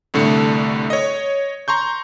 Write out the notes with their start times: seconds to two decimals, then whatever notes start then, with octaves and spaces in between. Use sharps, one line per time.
0.14 C2 A2 D3 A3 C#7
0.90 C#5 D#5
1.68 A#5 C6 C#6 G6